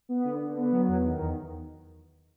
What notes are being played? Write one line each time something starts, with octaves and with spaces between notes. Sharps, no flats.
B3
D3
D3
B3
F#3
E2
D#3
E2